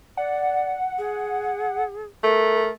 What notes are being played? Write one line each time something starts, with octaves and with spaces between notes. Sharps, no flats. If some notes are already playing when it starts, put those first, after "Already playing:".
D5 F#5
G#4
A3 A#4